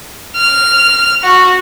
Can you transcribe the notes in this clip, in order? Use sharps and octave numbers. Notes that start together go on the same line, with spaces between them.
F6
F#4